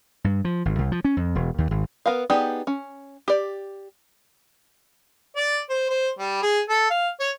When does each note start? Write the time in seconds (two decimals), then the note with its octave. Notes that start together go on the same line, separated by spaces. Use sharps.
0.24 G2
0.45 F3
0.65 G#1
0.79 C2
0.92 F3
1.05 C#4
1.17 F2
1.35 E1
1.58 D#2
1.71 G#1
2.06 B3 A#4 F5
2.30 B3 D#4 G4 G#4 D5
2.67 C#4
3.28 G4 D5
5.36 D5
5.69 C5
5.90 C5
6.19 G3
6.42 G#4
6.69 A4
6.90 F5
7.20 C#5